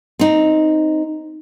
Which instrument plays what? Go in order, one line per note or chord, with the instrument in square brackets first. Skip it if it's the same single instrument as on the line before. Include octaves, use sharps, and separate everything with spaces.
[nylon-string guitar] C4 D#4